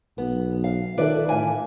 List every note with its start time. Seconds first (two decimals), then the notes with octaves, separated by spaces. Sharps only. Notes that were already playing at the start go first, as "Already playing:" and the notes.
0.18 B1 B3
0.64 F5
0.98 D#3 F4 A4 B4 D5 E5
1.29 A2 E3 F5 G#5